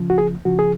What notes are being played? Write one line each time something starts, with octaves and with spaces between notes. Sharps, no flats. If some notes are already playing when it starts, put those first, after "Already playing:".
Already playing: C#2 C#3 F3
F#4
G#4
C#2 C#3 F3 F#4
G#4